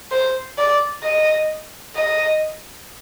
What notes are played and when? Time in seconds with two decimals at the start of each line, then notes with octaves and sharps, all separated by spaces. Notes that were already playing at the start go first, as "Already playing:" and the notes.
0.11 C5
0.58 D5
1.03 D#5
1.96 D#5